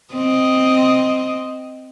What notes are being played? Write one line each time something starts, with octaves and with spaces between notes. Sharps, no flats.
C4 D#5